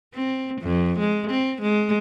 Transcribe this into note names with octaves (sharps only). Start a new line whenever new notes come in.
C4
F2
G#3
C4
G#3